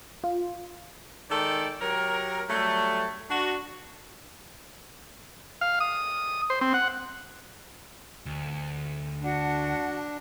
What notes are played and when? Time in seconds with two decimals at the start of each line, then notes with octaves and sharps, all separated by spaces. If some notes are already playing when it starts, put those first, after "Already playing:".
0.24 F4
1.31 D#3 G#3 A4 D5 G5
1.81 F#3 G4 A#4
2.50 F#3 G3 A3
3.31 D4 F#4
5.61 F5
5.80 D#6
6.50 C5
6.61 C4
6.74 F#5
8.26 D2
9.23 D4 F#4 F#5 A5